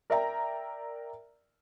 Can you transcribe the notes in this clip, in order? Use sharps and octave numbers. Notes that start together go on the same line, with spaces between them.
A#4 D5 E5 G5 A#5